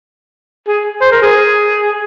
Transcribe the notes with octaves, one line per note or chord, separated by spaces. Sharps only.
G#4
C5
A#4
G#4